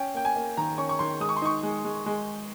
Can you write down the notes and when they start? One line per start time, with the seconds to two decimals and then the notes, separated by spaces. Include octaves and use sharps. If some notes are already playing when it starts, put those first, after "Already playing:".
Already playing: C#4 G5
0.14 A#3 G5
0.25 G#5
0.36 A#3
0.57 D#3 A#5
0.78 C#4 C#6
0.89 C#6
0.99 D#3 C6
1.20 G#3 D#6
1.29 C#6
1.36 C6
1.42 D#4 C#6
1.63 G#3
1.85 G#3
2.06 G#3